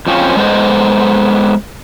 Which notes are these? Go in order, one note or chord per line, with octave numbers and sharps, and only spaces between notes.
F2 F3 C4 C#4
G#3 B3 A4 C5 D#5